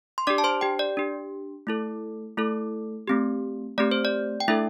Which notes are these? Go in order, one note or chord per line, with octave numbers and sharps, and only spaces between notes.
C6
D4 G4 D5 D6
A5
C5 C6
G4 G5
D5
D4 G4
A3 E4 A4
A3 E4 A4
A3 C4 G4
A3 C4 G4 D5
C5
D5
G5
A3 D4 E4 A4 E5